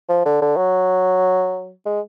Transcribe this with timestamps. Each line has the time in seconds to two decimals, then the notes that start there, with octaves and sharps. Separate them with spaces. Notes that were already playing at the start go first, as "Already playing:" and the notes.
0.09 F3
0.25 D3
0.42 D3
0.57 F#3
1.86 G#3